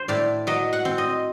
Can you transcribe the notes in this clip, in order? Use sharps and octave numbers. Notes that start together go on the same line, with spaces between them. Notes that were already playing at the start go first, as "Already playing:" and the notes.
Already playing: C5
A2 D5
F#3 D#5
F#5
C4
D#5